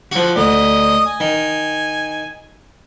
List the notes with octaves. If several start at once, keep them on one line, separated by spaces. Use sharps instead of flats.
D3 F3 F#4
D2 D#5
G#5
D#3